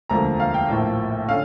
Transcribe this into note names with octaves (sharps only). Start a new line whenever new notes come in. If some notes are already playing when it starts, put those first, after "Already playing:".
E1 D2 D3 F3 A#3 A#5
F5
G5
A#1 A2 F3 A#3
D3 C#4 F5